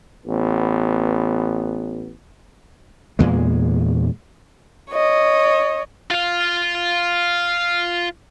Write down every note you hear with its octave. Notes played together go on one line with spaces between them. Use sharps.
A1 B3
E2 A#2 G#3
C#5 D#5
F4 F5